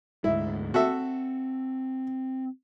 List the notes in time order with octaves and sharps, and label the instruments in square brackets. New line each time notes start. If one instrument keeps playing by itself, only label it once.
[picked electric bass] D2 G#2 G#3 [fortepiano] E4
[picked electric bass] C4 [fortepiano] F#4 A4 E5